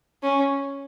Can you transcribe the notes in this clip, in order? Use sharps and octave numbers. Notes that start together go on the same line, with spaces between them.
C#4